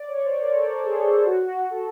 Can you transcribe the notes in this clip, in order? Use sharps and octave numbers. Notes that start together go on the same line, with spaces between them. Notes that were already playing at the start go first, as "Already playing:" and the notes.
Already playing: D5
C#5
C5
A#4
A4
A#4
G#4
A4
F#4
F#4
A4